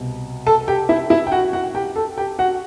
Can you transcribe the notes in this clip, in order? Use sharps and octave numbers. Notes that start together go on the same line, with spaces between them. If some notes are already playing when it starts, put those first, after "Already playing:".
Already playing: C2 B2
A4 A5
G4 G5
E4 E5
E4 E5
G5
F#4 F#5
F#4 F#5
G4 G5
A4 A5
G4 G5
F#4 F#5